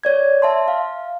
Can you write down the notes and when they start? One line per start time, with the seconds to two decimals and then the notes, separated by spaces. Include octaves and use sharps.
0.04 C#5 D5 G#6
0.42 E5 A5 C6
0.68 F5